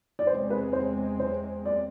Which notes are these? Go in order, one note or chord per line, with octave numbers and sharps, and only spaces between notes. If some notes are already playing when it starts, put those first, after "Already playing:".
D5
E2 C3 G#3 C4 C5
B4
C5
C5
D5